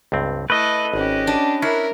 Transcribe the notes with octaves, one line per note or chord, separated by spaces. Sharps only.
C#2 G2 C4
A3 E4 A4 B4 D#5
G#1 C#4 G4
D4
C#4 D4 E4 A#4